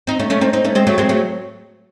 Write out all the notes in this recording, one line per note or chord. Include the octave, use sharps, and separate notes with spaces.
C4 D#4
A3 C#4
A3 C#4
C4 D#4
C4 D#4
A3 C#4
G#3 C4
F#3 A3
G#3 C4
F#3 A3